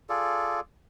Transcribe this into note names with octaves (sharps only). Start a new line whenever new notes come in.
F4 G#4 A4 D5